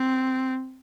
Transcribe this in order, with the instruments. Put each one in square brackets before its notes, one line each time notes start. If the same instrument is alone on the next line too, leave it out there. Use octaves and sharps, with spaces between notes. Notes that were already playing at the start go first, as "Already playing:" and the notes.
Already playing: [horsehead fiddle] C4